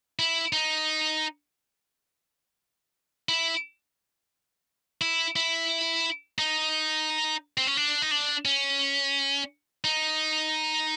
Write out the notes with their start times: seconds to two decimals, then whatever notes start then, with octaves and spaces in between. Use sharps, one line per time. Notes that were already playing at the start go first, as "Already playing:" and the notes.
0.19 E4
0.53 D#4
3.29 E4
5.01 E4
5.36 E4
6.39 D#4
7.58 C4
7.67 C#4
7.77 D4
8.02 D#4
8.11 D4
8.45 C#4
9.84 D#4